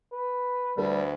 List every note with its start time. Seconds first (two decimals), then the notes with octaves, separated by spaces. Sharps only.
0.13 B4
0.77 D2 G3 A4 B4